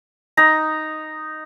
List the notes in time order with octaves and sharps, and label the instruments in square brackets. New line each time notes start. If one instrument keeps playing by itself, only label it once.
[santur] D#4 A#5